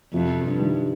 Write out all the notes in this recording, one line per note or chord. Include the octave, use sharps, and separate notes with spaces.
F2 C3 F3
G2
D#3 G3